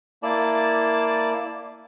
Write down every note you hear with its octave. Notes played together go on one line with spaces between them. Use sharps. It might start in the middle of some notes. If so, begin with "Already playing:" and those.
A#3 E4 D5 A5